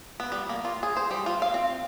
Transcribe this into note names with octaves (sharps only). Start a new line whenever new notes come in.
B3
G3
A#3
F4
G#4
C5
G3
F4
F5
C4